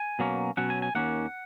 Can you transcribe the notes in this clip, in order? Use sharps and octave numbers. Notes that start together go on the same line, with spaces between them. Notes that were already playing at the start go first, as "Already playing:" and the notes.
Already playing: G#5
B2 F#3 A#3 C#4
B2 F#3 C#4 F#5
G#5
G#5
D#2 D#3 A#3 C#4 F#5